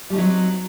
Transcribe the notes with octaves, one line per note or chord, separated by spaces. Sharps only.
F#3 G3 A3 C4 D#4